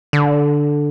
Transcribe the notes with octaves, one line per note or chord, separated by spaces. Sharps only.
D3